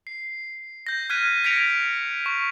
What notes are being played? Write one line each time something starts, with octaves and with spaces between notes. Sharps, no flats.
C7
G6 A#6
F6 F#6 G#6 B6 D#7
G#6 A#6 B6 C#7 D7 F7
C#6